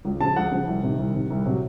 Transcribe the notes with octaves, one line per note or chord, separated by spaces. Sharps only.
C#2
C#3 F3 A5
C#2 F#5
C#3 F3
C2
C3 D#3
C2
C3 D#3
C2
C3 F#3